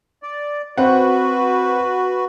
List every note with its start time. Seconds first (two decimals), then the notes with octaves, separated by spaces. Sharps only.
0.23 D5
0.78 C4 F#4 B4 F#5